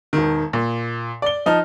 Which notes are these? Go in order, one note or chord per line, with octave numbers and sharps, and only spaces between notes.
E1 D#3
A#2
D5 G7
F3 D#4 A5 F6